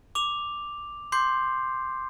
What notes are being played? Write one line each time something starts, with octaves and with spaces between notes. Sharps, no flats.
D6 F7
C6 D6 G6 C7